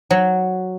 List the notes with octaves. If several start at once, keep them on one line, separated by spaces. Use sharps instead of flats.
F#3